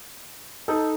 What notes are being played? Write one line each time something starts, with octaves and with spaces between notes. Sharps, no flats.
D#4 A4